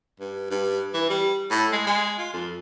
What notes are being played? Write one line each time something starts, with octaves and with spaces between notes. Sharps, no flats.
G2
G2
E3
G3
A2
G#3
G#3
F4
F2